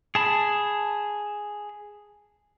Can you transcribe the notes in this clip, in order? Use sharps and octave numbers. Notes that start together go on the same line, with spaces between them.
G#4 A5 B5